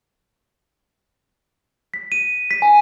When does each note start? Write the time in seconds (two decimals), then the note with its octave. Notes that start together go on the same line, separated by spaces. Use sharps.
1.94 B6
2.12 D#7
2.51 B6
2.62 G#5